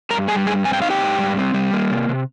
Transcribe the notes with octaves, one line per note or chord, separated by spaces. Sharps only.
G2 A#4 A#5
G3 G#4 G#5
G2 G#4 G#5
C4 G#5
G5
D#4 F5
G4 G5
G#2
G3
C4
G3
A#3
C3
C3